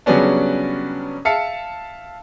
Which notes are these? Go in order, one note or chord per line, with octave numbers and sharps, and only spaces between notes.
C#3 F#3 G3 B3 C#4 D4
E5 F5 A5 C#7